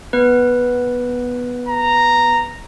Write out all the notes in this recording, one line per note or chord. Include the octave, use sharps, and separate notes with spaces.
B3 B4
A#5